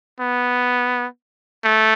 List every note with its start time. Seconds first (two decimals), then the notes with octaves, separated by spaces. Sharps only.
0.20 B3
1.64 A3